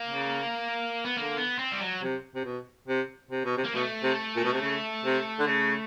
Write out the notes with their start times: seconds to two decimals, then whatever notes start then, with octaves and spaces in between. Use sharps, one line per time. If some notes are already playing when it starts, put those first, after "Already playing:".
Already playing: A#3
0.08 C#3
1.05 B3
1.16 D3 A#3
1.37 B3
1.59 C4
1.72 G3
1.80 F#3
2.03 C3
2.35 C3
2.45 B2
2.88 C3
3.31 C3
3.45 B2
3.57 C3
3.64 A#3
3.75 B2 A3
4.03 C3
4.36 A#2
4.44 B2
4.53 C3
4.62 C#3
5.05 C3
5.39 D3
5.47 C#3